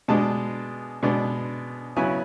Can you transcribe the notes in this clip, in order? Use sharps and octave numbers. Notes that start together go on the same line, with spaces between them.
B2 G#3 D4 A5
B2 G#3 D4
C#3 F#3 B3 E4 G#5